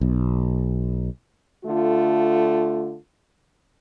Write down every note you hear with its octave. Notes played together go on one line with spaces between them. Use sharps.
B1
D3 A3 F4